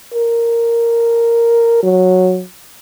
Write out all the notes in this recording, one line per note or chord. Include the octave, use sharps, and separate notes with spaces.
A#4
F#3